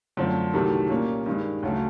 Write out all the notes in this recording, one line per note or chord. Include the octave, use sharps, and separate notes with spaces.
F#2 D3 F3 A3 C4
C2 C3 D#3 F#3 A3
A#2 G3 A#3 C#4
G2 D#3 G#3
D2 C#3 F#3 A3